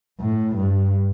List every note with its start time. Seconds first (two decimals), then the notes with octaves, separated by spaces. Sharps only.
0.20 A2
0.56 G2